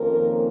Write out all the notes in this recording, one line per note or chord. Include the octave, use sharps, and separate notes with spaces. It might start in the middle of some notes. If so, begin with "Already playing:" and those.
Already playing: F2 D#3 A#3 C#4 A#4